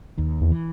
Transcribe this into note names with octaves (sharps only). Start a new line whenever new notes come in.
D#2 D#3
E2
E3